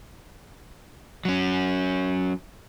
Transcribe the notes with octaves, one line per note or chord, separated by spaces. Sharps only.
F#3 C#4